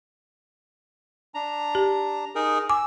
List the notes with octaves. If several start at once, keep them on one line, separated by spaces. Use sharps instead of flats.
D4 A#5
G4
D#4 G#4 A#4
G#5 D6 E6